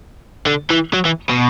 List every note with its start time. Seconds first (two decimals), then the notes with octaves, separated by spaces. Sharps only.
0.46 D3
0.70 E3
0.93 F#3
1.05 E3
1.30 B2